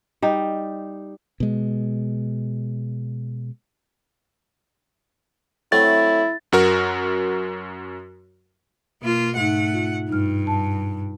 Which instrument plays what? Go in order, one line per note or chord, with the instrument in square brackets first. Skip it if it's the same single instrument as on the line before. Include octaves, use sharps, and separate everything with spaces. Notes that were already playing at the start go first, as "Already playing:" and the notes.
[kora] G3 D#4
[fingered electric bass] B2 G#3
[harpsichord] F#3 A3 C4 [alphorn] E4 [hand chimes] A6
[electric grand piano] F#2 F#4 A#4
[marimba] B2 [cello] A#3 F4
[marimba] G#2 D#4 [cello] A3 F#5
[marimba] F4
[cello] G2 [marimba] D#4 F6
[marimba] A5